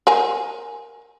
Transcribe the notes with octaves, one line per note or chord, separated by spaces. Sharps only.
A#4 G#5 A#5